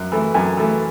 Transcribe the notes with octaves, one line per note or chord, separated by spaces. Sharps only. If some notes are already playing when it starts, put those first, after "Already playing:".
Already playing: F#2
E3 A3
F#2 G#5
E3 A3